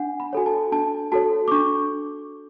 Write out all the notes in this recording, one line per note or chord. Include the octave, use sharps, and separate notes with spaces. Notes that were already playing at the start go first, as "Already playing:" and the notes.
Already playing: D4 F#5 G#5
B5
F#4 A4 C#5 G#5
A5
D4 A5
F#4 A4 C#5 A5
D6
D4 C#6